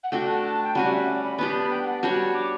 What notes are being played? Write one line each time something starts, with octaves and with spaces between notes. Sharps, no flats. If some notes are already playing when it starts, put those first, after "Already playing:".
F#5
A3 D4 F#4 G5
A5
G5
G3 C#4 F#4 F#5
D5
E5
D5
B5
B3 D4 G4 B5
A5
B5
G5
G5
F#5
G3 D4 F#4 C#5
D6